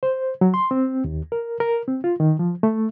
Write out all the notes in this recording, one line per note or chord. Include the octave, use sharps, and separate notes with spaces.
C5
F#3
C6
C4
D#2
A#4
A#4
C4
F4
D#3
F3
A3